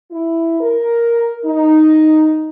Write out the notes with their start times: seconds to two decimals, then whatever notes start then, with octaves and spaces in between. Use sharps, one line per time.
0.11 E4
0.61 A#4
1.44 D#4